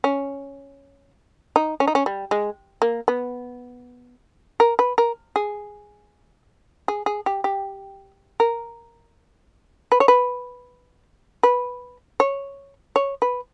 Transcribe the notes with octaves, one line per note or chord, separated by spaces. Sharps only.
C#4
D#4
C#4
D#4
C#4
G3
G#3
A#3
B3
A#4
B4
A#4
G#4
G#4
G#4
G4
G4
A#4
B4
C#5
B4
B4
C#5
C#5
B4